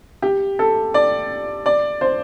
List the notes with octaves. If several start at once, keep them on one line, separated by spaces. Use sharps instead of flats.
G4
A4
D5
D5
C5